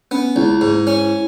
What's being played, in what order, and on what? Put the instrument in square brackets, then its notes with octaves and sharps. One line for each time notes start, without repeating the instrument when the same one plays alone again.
[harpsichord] B3 [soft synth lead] C#4
[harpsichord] C#2 [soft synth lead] E4
[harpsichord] G#2
C#4